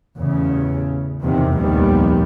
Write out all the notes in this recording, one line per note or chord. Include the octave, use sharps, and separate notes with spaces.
A1 E2 C#3
E2 C3 D#3
F1 A#1 D#2 D#3 G3 B3